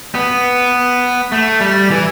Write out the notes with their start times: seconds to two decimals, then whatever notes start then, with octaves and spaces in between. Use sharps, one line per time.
0.15 B3
1.32 A3
1.61 G3
1.91 E3